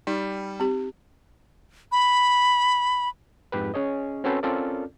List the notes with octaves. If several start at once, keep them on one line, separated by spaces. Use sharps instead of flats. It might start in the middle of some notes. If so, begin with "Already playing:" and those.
G3 D#4
C4 G4
B5
F2 G#2 G4 B4
C#4 G#4 C#5 D#5
C4 C#4 F#4 A4 B4 C5
C4 C#4 F4 A4 A#4 D5